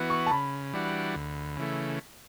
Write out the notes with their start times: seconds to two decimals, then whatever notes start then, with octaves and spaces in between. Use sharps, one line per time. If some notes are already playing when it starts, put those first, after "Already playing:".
Already playing: E3 B3 F#4
0.10 C#6
0.26 A5
0.31 C#3 B5
0.73 E3 G3 D4 F#4
1.15 D2
1.57 C#3 E3 A3